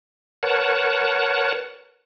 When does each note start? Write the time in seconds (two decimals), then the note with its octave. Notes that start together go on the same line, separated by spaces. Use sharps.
0.43 A#4 B4 C#5 F#5 A5